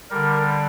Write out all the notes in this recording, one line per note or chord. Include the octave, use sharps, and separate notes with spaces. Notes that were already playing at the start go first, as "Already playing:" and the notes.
D3 G3 A#4